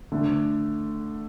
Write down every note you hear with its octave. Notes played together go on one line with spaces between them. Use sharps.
D3 A3 D4